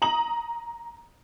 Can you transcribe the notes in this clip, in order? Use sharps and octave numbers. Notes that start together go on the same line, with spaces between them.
A#5 D#6 F#7